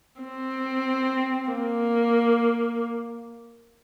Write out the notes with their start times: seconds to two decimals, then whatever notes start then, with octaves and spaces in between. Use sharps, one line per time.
0.21 C4
1.50 A#3